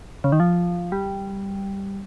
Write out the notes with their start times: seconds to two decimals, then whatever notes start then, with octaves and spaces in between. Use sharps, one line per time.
0.24 C#3
0.32 D#3
0.40 F3
0.92 G3